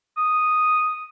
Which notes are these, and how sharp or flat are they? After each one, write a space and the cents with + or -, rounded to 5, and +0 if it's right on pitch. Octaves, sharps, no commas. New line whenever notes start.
D#6 -5